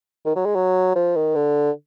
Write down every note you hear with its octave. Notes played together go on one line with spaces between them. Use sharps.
D#3
F#3
G#3
F#3
F3
D#3
D3